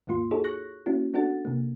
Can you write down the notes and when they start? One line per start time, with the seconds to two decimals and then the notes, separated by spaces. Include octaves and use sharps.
0.07 D#2 G#2 A#3 F4 C6
0.31 D#4 F#4 G#4 A4 C#5
0.44 C#6 F#6 A#6
0.86 A#3 C#4 E4 F#4
1.14 B3 D4 F#4 A4 F#5 A6
1.45 C3 A#3